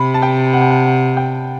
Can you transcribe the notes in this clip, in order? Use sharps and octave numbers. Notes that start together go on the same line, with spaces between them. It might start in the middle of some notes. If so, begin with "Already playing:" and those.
Already playing: C3 B5
A5
G5
F#5
G5
F#5
F#5
G5